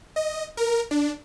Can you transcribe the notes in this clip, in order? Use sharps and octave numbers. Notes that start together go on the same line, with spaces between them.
D#5
A#4
D4